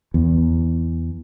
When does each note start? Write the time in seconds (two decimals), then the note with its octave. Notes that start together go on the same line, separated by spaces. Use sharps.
0.14 E2